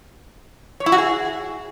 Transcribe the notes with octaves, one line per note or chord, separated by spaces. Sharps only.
C#5
E4
F#4
G#4